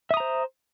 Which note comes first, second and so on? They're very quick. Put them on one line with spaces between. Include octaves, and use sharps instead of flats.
E5 D#6 A#5 C5